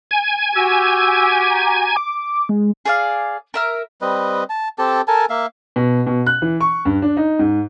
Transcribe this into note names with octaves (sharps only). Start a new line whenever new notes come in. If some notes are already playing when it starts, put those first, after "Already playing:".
G#5
F#4 G4 E6
A#5
D6
G#3
G#4 D5 F5
A#4 E5 F6
G3 C4 B4 D#5
A5
C4 G4 A4 A5
A4 A#4 G#5 A5
A#3 E5 F5
B2
B2
F#6
E3
C#6
G2
D4
D#4
G#2